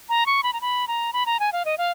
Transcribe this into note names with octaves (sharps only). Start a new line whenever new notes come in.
A#5
C#6
B5
A#5
B5
A#5
B5
A#5
G#5
F5
D#5
F5